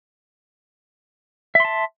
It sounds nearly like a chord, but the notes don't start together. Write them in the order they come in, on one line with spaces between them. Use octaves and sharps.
E5 C6 A5